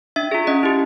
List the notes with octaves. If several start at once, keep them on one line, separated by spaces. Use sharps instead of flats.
D4 E5
F4 G#4
C#4 D#5
E4 G4